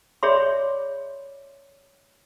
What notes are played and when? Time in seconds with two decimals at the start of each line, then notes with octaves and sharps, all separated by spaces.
0.23 G#4 C#5 D5 E5 B5 C6